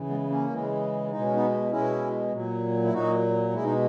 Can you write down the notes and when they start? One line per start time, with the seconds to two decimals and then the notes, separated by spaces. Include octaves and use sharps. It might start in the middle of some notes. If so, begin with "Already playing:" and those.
Already playing: C#3 E3
0.09 G#3 B3
0.30 A#3 C#4
0.50 C#3 E3 G#3
1.11 B2 G#3 D#4
1.22 C#4
1.35 B3 D#4
1.71 B2 G#3 C#4 E4
2.33 A#2 F#3
2.84 E4
2.93 A#2 F#3 D#4 F#4
3.54 B2 G#3 E4
3.64 D#4